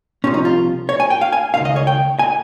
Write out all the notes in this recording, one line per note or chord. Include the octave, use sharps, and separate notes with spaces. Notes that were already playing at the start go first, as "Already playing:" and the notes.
C2 C3 F3 C#4
D#4
F4
C#5
G#5
G5
F5
G#5
C#2 C3 D#3 F5
D#5
C#5
G5
G#5